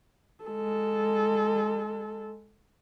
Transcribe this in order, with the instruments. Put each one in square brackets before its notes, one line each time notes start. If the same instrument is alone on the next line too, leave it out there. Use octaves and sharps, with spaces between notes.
[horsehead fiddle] G#3 A4